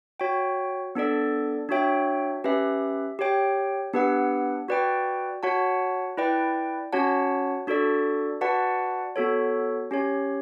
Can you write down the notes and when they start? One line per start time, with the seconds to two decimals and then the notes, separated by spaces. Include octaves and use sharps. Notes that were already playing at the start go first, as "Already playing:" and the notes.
0.20 F#4 C#5 G5
0.95 B3 D4 A4 D5
1.69 D4 F#4 C#5 E5 G5
2.44 C#4 G4 B4 E5
3.19 G4 C#5 G5
3.93 B3 D4 G4 B4 F#5
4.68 F#4 B4 D5 G5
5.43 F#4 C#5 F#5 A5
6.17 E4 B4 D5 G5
6.93 C#4 F#4 C#5 F#5 A5
7.67 D4 F#4 A4 D5
8.41 F#4 B4 D5 F#5 A5
9.16 B3 F#4 A4 C#5
9.91 C#4 G4 C#5